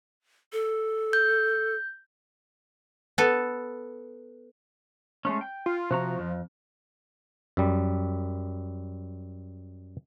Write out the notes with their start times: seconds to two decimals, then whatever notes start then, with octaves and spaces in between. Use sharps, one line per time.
0.53 A4
1.13 G6
3.18 B3 A4
5.25 G#3 A3 C#4
5.41 G5
5.66 F4
5.91 C3 F3 F#4 A#5
6.19 F2
7.57 F#2 G3